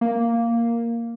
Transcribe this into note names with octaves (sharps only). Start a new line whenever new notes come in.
A#3